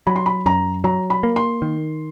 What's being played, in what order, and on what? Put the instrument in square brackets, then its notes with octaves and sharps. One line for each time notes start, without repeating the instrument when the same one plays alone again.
[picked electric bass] F#3 [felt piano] B5
[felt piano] C6
B5
[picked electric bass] F#2 [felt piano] A#5
[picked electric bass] F#3 [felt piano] A#5
[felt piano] B5
[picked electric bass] A#3
[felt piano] C6
[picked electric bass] D#3